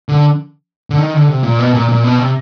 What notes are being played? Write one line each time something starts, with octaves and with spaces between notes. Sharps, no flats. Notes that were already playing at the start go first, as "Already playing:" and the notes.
D3
D3
D#3
D3
C3
A#2
B2
A#2
A#2
B2
C3